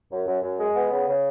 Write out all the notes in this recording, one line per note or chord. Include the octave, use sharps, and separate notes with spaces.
F#2
F#2
F#2
G#3
B3
C#3
C#3